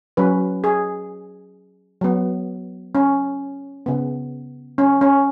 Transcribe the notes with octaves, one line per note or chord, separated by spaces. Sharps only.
F#3 C#4 B4
G#4
F#3 B3
C#4
C#3 B3
C#4
C#4